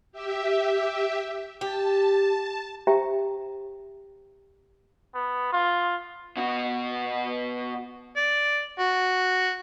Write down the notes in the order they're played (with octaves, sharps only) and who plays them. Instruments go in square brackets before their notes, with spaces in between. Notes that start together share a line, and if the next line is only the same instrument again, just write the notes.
[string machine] G4 E5
[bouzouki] G4 [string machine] A5
[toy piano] G4 C5 E5 G5 A#5
[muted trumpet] B3
F4
[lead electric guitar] B2 F#4
[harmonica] D5
F#4